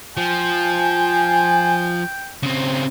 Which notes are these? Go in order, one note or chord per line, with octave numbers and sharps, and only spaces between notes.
F3 G5 G#5
C#3 C4